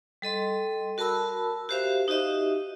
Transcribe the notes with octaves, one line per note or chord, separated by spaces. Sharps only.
G3 A4 D#5 C6
F#4 A#4 A5 B5 E6
F#4 G4 C5 E5 F5
D#4 F#4 G4 D#5 E5